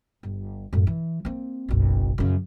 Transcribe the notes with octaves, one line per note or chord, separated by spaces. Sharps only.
G1
F#2 A2
E3
A#3 C4
F#1 B1
F#2 C#3